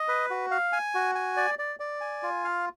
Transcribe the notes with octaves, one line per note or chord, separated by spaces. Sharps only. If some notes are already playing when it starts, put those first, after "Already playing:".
Already playing: D#5
B4
F#4
F5
G#5
F#4
G#5
D5
D5
D5
G#5
F4
F5